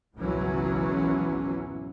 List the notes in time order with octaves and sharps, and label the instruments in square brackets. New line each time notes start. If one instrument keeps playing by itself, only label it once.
[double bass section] G#1 C#2 B2 E3 F#3 C#4